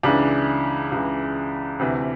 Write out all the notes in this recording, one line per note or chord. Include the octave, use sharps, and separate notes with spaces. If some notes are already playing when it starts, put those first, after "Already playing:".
C#2 C#3 E3 D4
C#2 C#3 E3
D2 C3 E3